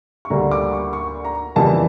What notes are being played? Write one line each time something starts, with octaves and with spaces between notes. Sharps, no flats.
C#6
D2 D3 G3 A#3 A#5
D6
C#6
C#6
A#5
F2 C#3 E3 G3 A#3 A5